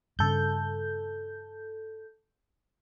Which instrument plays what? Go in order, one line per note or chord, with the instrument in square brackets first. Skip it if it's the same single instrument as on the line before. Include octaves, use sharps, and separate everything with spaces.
[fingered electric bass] G2 C#3 [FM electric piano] A4 G6